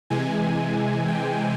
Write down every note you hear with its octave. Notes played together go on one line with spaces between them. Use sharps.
C3 E3 G#3 G#5
G5